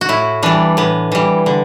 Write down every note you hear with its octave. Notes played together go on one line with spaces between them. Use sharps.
F#4
A2 E4
E3 G3 D4
A2 B3
E3 G3
D3